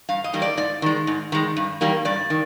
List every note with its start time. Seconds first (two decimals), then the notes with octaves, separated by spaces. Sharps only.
0.09 G2 F5
0.24 D#5
0.33 D#3 G3 A#3
0.42 D5
0.57 G#2 D5
0.82 D#3 G#3
1.07 G#2
1.32 D#3 G#3
1.57 G2
1.81 D#3 G3 A#3
2.05 G2 D5
2.30 D#3